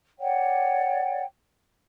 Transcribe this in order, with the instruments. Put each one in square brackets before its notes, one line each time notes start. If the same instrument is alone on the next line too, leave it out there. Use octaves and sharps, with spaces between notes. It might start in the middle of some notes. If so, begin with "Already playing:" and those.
[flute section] C#5 D5 F#5 G5